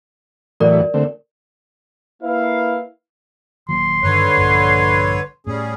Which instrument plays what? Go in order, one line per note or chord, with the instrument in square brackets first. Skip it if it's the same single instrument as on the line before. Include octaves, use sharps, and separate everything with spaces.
[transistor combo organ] A2 E3 F#3 [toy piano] A#4 D5
[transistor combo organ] D3 A3 C4
[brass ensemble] A#3 E4 B4 F5
[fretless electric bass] D#1 D#2 F#3 [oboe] C6
[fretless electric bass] G2 D#3 [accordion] D3 B4 C#5
[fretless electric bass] A#1 G2
[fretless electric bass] A2 [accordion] G3 C#4 G#4